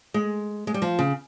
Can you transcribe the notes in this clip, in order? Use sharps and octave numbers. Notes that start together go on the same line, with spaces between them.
G#3
G#3
G3
F3
C#3